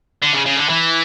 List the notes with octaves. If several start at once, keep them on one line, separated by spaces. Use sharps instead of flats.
D3
C#3
C#3
D3
E3